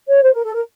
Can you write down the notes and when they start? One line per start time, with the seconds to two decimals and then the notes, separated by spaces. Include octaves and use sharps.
0.08 C#5
0.23 C5
0.34 A#4
0.44 A4
0.54 A#4